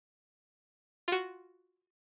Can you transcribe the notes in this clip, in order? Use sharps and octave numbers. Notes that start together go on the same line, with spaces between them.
F4 F#4